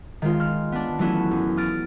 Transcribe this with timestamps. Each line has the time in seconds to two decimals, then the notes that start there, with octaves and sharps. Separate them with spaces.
0.22 D#3 G#3 F4
0.40 F6
0.72 B3 D4
0.99 E3 F#3 A3 B3 C#4 E4
1.31 F#2
1.57 D#6 F6 A6 D7